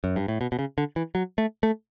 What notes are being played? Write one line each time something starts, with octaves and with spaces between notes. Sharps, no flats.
F#2
G2
A2
B2
B2
C#3
D3
E3
F#3
A3
A3